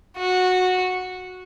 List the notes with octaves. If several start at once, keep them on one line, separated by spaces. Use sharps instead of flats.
F#4